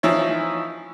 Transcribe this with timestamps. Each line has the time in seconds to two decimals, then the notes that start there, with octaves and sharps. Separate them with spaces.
0.03 E3 F3 D#4 E4 C#5